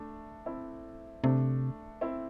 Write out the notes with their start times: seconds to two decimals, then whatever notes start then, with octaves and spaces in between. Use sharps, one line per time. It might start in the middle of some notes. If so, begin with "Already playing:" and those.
Already playing: A3 D4
0.46 C4 E4
1.24 C3 A3 D4
2.01 C4 E4